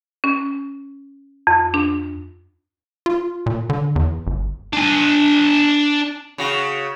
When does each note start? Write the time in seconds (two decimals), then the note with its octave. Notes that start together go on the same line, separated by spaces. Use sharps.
0.24 C#4
1.47 F2
1.74 D4
3.06 F4
3.46 A#2
3.70 D3
3.96 E2
4.27 G1
4.73 D4 G#5
6.38 C#3 F#4